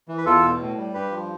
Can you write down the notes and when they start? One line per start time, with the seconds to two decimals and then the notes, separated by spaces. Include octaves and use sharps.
0.08 E3
0.18 B4
0.26 E2 F4 A4
0.43 B2
0.60 A2
0.77 G3
0.94 G2 G4 B4
1.11 F3